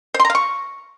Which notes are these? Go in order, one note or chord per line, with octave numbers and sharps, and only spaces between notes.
C5
C6
A#5
F5
C#6